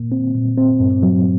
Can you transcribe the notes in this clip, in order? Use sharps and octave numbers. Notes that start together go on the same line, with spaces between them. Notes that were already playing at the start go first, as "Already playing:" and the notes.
Already playing: A#2 A#3
C4
A#2
C4
G2
F#3